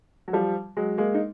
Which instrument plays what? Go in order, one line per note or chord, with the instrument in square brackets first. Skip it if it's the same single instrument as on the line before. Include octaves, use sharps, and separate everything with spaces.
[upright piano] F#3
F3 G3
F#3 G#3
G#3 A#3
D#4